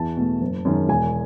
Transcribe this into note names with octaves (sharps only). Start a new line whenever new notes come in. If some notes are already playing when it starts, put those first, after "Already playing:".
Already playing: E2 A5
B2 A3
F#1
F#2 D#3 G#3
E1 G#5